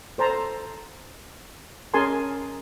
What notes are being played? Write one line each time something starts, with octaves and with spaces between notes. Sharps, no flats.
A4 C5 A5 A#5
C#4 G#4 A#4 G#5 A5 C6